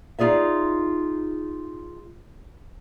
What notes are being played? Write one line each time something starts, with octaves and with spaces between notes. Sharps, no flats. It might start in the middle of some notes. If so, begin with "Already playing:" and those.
D#4 F4 G#4 D5 E5